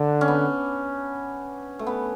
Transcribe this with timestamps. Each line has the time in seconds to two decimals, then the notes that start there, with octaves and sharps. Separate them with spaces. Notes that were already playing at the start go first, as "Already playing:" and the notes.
Already playing: D3 D4
0.21 C#4
0.28 B3
1.79 A3
1.87 B3